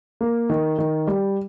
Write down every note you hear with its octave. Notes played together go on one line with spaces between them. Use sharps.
A#3
D#3
D#3
G3